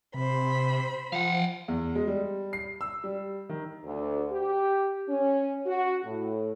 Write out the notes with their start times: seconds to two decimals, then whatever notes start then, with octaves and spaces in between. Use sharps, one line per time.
0.14 C3 C5 B5
1.12 F3 F5 F#5
1.68 E2
1.95 G#3
2.07 G3
2.53 C7
2.81 E6
3.04 G3
3.49 D#3
3.84 D2
4.30 G4
5.09 C#4
5.66 F#4
6.05 A2